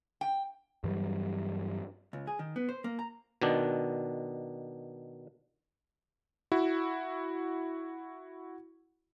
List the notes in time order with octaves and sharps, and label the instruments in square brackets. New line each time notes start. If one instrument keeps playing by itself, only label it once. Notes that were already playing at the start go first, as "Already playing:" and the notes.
[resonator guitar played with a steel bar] G5
[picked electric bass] G2 E3 F#3 G3
[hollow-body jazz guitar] C#2
G#4
D#3
B3
C5
A#3
A#5
[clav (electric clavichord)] B2 D#3 D4
[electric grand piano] E4 F#4